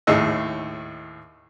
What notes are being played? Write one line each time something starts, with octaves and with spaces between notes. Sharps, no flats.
D#2 A2 G#4 D#5 E6